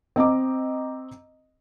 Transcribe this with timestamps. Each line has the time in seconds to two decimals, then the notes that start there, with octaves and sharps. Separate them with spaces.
0.16 C4 D#5 A#5 D6